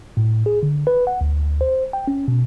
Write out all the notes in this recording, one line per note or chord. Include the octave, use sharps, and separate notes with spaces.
A2
G#4
D3
B4
F#5
D2
C5
G5
C#4
B2